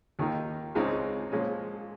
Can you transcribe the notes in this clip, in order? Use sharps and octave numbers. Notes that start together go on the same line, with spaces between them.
D#2 D#3 A#3 D#4
C#2 C#3 G#3 C4 D#4
A#2 F3 G#3 C#4